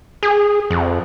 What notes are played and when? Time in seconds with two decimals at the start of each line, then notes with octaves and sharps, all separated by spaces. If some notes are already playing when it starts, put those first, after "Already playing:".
0.23 G#4
0.70 F2